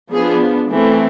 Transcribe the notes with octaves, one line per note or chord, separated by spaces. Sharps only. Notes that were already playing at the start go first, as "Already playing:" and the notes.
F3 B3 D4 G#4
E3 A3 C4